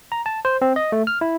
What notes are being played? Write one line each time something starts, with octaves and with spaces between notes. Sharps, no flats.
A#5
A5
C5
C4
D#5
A3
F6
E4